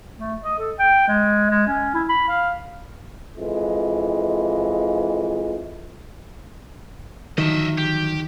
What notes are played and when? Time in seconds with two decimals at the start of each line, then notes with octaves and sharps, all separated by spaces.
0.18 A3
0.44 D#5
0.58 A4
0.79 G5
1.08 G#3
1.51 G#3
1.67 C#4
1.94 E4
2.09 B5
2.29 F5
3.38 F2 E3 G#3
7.38 D3 D#3 F3 F#3 D#5 E5
7.78 G4